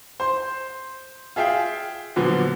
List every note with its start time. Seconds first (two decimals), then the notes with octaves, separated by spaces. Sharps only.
0.20 C5 C6
1.36 F4 G#4 E5 F5 G5
2.16 A#2 D3 F3 F#3 B3